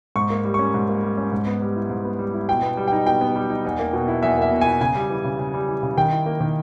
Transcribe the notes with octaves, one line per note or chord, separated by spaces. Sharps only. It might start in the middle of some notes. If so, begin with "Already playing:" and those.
G#2 C#6
A#3
G3
C#4 C#6
G#2
A#3
G3
C#4
G#2
B3
G3
E4
G#2
B3
G3
E4
B2 G5
B3
G3
D#4 G5
B2 G5
B3
G3
D#4
E2
A#3
B2
E4
E2 E5
A#3 E5
B2
E4 G#5
C#3 G#5
G3
E3
C#3
C#3
G3
E3
C#3
D#3 G5
E4
A#3
D#3